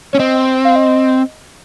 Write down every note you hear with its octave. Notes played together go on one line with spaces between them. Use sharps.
C#4 C#5
C4 D#5
F5
D#5